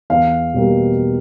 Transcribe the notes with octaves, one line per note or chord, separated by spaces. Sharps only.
E2 F5
B2 G3 A#3